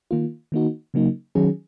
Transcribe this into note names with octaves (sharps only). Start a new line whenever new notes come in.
D#3 A#3 F4
D#3 A#3 D#4 F#4
C#3 F#3 A#3 D#4
D#3 F#3 C#4 G#4